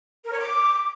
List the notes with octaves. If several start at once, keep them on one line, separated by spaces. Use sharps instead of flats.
A#4
C#5
D6